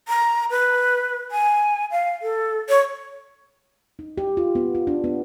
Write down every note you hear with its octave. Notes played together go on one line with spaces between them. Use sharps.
A#5
B4
G#5
F5
A4
C#5
D#4
G4
F4
B3
F4
D4
B3